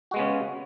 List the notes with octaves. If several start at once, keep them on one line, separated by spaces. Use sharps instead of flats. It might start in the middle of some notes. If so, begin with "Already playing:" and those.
C#3 G#3 B3 C#4 F#4